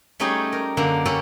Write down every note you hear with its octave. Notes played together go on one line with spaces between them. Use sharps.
G3 A3 C#4 D#4 G4 G#4
A#4
F#2 D3 A#3 D4
D3 C#4 G4 A4 B4 D5